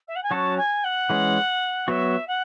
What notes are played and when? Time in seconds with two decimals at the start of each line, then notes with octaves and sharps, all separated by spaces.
0.07 E5
0.15 F#5
0.23 G#5
0.31 F#3 C#4 F#4 C#5 A5
0.57 G#5
0.84 F#5
1.10 E3 G#3 C#4
1.88 F#3 B3 F#4 E5
2.27 F#5